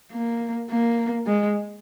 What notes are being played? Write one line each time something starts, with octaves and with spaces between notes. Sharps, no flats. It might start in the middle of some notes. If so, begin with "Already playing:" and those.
A#3
A#3
G#3